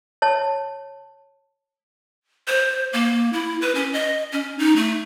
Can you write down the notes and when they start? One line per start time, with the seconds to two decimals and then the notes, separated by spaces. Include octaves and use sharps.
0.22 C#5 A5
2.48 C5
2.93 A#3
3.33 E4
3.62 B4
3.75 C#4
3.93 D#5
4.32 C#4
4.58 D#4
4.76 A3